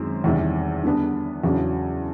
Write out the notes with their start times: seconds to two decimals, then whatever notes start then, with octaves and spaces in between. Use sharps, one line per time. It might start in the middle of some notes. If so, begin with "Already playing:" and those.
Already playing: F#2 D#3 G#3 C4
0.24 E2 C3 D#3 G3
0.83 D3 G3 B3 D4
1.43 E2 C#3 F#3 B3 D4